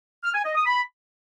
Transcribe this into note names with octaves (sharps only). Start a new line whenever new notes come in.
F6
G#5
D#5
D#6
B5